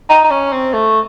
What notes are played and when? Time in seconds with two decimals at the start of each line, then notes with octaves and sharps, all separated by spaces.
0.09 D#4
0.24 D#4
0.30 C#4
0.52 C4
0.73 A3